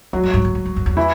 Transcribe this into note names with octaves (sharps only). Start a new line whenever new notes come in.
E2 F#3 F#4
F#2
G2
A2
A2
G2
F#2
E2
E3 E4